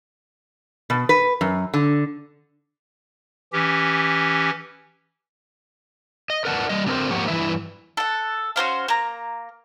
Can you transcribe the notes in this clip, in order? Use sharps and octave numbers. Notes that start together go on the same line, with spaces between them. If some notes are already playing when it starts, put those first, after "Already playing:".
B2
B4
F#2
D3
E3 C#4 G4
D#5
A#4 B4 D5 F#5 G#5 A5
G3 D#5
D3 A3 C4 G#4 A#4 C5
G#2 F3 A#3 G4 C#5 F#5
G2 E3 E4 B4 E5
A4 F#5
C#4 F#4 C5 F5
A#3 A#5